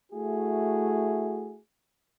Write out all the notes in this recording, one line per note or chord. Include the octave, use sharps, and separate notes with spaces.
A3 E4 F#4 G#4